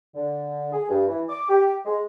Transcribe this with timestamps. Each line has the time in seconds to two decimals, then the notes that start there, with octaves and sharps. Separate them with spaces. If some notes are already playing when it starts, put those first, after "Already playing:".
0.15 D3
0.73 G#4
0.89 G2
1.08 E3
1.29 D6
1.49 G4
1.85 G#3